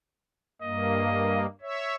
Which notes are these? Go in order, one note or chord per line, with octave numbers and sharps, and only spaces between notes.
G2 A#3 D#5
C#5 E5